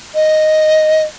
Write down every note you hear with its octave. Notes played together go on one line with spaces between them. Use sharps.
D#5